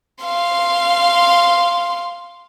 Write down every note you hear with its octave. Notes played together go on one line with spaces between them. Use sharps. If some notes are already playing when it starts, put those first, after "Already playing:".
F5 C6